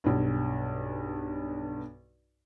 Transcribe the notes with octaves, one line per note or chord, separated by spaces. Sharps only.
B1 G2